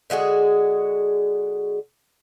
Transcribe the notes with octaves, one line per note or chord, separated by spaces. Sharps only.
D3 G#3 F#4 G#4